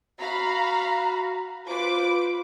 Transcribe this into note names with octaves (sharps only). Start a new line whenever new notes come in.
F#4 F5 A#5 B5
F4 B4 C5 D6